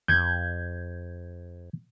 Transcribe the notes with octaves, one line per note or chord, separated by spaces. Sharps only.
F2 G6 G#6